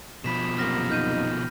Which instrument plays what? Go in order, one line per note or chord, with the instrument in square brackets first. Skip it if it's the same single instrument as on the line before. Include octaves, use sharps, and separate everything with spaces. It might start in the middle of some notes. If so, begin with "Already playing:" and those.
[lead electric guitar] B2 F3 [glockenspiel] B5 B6 E7
[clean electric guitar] F#2 C3 A#3 [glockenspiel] F6 A#6
[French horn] D#4 [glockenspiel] F6 G6 D#7